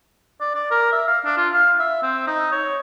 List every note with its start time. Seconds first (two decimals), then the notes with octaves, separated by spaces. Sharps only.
0.41 D5
0.55 D5
0.71 A#4
0.92 E5
1.08 F5
1.25 D4
1.37 F4
1.53 F5
1.79 E5
2.03 C4
2.27 D#4
2.52 C#5